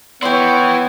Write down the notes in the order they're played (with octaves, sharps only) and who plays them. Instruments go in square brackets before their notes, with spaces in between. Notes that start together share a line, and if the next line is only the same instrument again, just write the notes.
[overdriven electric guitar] E3 E4 [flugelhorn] B3 [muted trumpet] C#5 [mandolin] G5 C6